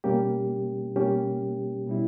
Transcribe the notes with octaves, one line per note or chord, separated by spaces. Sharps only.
B2 G3 A#3 C#4 G4
B2 G3 A#3 C#4 G4
B2 G3 C#4 E4